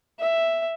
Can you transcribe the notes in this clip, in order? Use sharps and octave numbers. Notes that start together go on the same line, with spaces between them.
E5